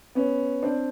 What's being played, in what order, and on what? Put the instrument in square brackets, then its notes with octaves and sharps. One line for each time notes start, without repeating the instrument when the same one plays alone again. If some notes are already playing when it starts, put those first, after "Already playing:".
[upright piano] B3 C#4
C4 D4